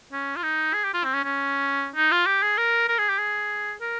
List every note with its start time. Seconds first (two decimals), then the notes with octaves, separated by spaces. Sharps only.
0.12 C#4
0.36 F4
0.43 D#4
0.73 G#4
0.84 G4
0.94 F4
1.05 C4
1.14 C#4
1.24 C#4
1.96 D#4
2.12 F4
2.26 G4
2.42 G#4
2.57 A#4
2.88 A#4
2.99 G#4
3.09 G4
3.19 G#4
3.81 A#4